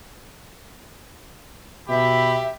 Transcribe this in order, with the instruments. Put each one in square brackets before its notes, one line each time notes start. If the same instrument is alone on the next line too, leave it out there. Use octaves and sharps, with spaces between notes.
[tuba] B2 [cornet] G4 [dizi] E5 [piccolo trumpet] B5